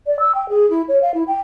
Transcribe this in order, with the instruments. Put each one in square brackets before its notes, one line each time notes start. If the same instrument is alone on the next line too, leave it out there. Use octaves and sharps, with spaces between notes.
[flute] D5
E6
G5
G#4
E4
C#5
F5
E4
G5